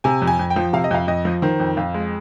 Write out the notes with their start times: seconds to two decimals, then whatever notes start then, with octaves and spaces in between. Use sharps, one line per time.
0.04 C3 G#5
0.22 F2
0.27 G#5
0.39 F2
0.50 G5
0.56 F3
0.73 C3 F5
0.84 D#5
0.91 F2 F5
1.08 F2 D#5
1.25 F3
1.42 D#3 C5
1.60 F2
1.77 F2 F4
1.94 G#3